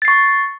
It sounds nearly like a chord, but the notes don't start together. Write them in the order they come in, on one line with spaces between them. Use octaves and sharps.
A6 C7 C#6